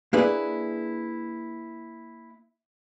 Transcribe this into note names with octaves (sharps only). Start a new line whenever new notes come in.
A#3 D4 E4 G#4 B4